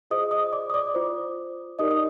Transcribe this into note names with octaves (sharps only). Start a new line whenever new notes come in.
F4 G#4 C5 D#5 D#6
D#5 D#6
D5 D6
D#6
D5 D6
F4 C5
D#4 G4 A#4 D5 D#5 D#6
D#6